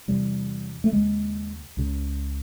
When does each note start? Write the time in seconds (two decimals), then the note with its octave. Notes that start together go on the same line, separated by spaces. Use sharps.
0.08 E2 C3 G3
0.84 A3
0.92 D#2 C#3 G#3
1.77 C#2 C#3